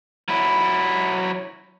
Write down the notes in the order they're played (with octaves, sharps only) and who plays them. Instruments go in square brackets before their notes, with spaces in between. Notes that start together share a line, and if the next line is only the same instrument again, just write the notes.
[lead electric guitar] F#3 E4